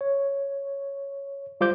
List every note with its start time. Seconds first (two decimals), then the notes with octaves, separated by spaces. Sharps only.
0.01 C#5
1.61 G3 F4 C5 D6 G6